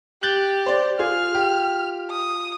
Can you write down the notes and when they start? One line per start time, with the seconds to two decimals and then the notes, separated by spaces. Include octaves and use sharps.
0.23 G4 F#6 G6 A6 F#7
0.66 C5 D5
0.99 F4 G#4 F6
1.35 G4
2.11 D#6